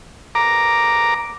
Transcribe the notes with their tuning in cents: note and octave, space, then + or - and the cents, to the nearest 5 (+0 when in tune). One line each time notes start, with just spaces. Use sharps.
A#5 +0 D6 +0